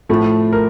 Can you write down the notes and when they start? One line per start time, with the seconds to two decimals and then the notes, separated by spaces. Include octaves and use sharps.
0.09 A2 F3 A3
0.53 A#4